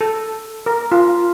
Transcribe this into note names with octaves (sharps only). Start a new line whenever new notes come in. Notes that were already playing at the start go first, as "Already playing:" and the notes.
A4
A#4
F4